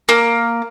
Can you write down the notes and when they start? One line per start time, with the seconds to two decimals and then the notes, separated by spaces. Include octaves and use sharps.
0.09 A#3